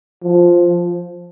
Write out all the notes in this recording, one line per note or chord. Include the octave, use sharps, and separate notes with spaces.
F3